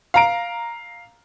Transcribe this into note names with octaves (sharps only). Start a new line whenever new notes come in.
F5 A#5 D7